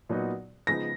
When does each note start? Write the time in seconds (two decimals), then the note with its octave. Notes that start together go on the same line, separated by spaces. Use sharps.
0.09 A#2 F#3 B3 D#4 F#4
0.67 C#3 F3 G#3 B3 D#4 A#6